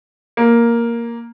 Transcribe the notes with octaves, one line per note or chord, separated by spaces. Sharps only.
A#3